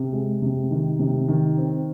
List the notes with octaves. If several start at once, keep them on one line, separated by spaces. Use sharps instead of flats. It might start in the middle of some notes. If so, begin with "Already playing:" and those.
Already playing: C3
G#3
C3
D#3
C3
D#3
C4